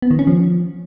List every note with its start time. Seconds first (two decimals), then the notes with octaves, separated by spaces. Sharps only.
0.02 B3
0.11 D#3
0.19 C#4
0.27 F3